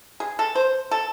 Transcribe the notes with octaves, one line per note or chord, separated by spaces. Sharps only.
G#4
A4
C5
A4